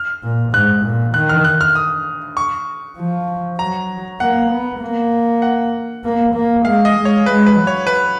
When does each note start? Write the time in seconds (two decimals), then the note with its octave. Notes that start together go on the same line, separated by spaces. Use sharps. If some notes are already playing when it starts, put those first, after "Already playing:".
Already playing: F6
0.23 A#2
0.53 G#2 F#6
0.84 A#2
1.14 D#3 F#6
1.29 F6
1.44 F#6
1.61 F6
1.75 D#6
2.37 C#6
2.98 F3
3.59 F#3 A#5
4.20 A#3 F#5
4.51 B3
4.81 A#3
5.42 F#5
6.04 A#3
6.34 A#3
6.65 G#3 F5
6.85 D#5
6.95 G#3
7.05 C#5
7.26 G#3 B4
7.46 B4
7.56 F#3
7.67 C#5
7.87 B4